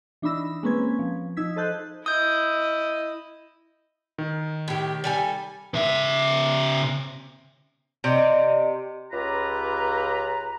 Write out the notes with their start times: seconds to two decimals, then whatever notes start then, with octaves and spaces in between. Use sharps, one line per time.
0.22 E3 D4 D#4 B5 E6 A#6
0.63 G#3 A#3 C4 C#4 B4 G#6
0.99 F3
1.37 F3 D#4 E6 G#6 B6
1.56 A4 C5 D#5 A5 F#6 G6
2.06 E4 D#5 D#6 G6
4.18 D#3
4.68 A2 G4
5.04 G3 A4 G#5
5.74 C#3 E5
8.04 C3 D5 D#5
9.12 C#2 C#3 F4 G4 B4 A#5